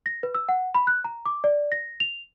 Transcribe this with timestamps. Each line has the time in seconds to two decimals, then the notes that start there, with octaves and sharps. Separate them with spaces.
0.06 A#6
0.23 B4
0.35 E6
0.49 F#5
0.75 B5
0.87 F#6
1.04 A#5
1.26 D6
1.44 D5
1.72 A#6
2.00 F7